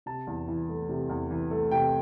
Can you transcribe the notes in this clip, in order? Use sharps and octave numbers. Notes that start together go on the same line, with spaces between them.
C3 A5
E2
E3
A3
C3
E2
E3
A3
C3 G5